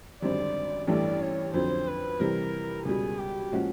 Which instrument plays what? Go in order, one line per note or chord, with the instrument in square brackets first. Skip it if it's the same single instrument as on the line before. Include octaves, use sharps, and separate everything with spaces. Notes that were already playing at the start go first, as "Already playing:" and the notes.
[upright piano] G#1 F#2 D3 G3 C4 [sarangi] D5
[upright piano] A1 G2 E3 A3 [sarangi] D5
[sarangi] C#5
[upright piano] F2 D3 F#3 [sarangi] C5
[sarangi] B4
[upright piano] C3 E3 G3 [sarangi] A#4
[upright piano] C#2 B2 G3 [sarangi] G#4
[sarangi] G4
[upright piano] A#2 F3 G#3 C#4 F#4